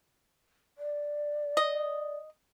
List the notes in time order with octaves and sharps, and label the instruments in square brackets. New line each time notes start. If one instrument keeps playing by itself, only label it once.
[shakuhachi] D5
[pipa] D#5